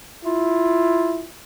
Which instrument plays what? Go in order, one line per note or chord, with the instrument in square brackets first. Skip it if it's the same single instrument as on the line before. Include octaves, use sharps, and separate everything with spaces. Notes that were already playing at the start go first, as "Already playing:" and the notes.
[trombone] E4 [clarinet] F4